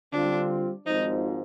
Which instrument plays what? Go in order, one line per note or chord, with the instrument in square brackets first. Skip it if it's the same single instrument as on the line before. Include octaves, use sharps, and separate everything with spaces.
[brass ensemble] D3 G3 C4 F4 [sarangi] D4
[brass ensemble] G#1 G#2 F3 [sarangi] D#4